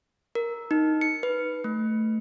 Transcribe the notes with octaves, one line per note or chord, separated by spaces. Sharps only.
A#4
D#4
C#7
B4
A3